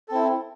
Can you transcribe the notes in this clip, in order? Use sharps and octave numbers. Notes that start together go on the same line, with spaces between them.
C4 E4 A4